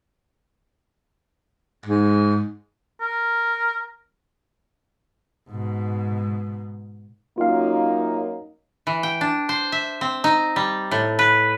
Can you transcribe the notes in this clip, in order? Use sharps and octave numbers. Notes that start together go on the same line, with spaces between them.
G#2
A#4
G#2 B2
F#2 A#3 D#4 F4 F5
E3
G5
D4
C5
E5
C4
D#4
G3
A2
B4